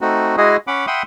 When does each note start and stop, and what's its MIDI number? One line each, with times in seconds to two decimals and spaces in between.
0.01 0.36 57
0.01 0.36 60
0.01 0.36 63
0.01 0.36 66
0.37 0.57 56
0.37 0.57 64
0.37 0.57 66
0.37 0.57 68
0.37 0.57 75
0.67 0.86 61
0.67 0.86 78
0.67 0.86 83
0.67 0.86 86
0.87 1.03 76
0.87 1.03 78
0.87 1.03 79
0.87 1.03 83
0.87 1.03 84
0.87 1.03 87